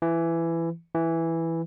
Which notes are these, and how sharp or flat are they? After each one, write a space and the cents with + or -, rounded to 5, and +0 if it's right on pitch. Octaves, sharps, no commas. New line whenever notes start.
E3 +15
E3 +0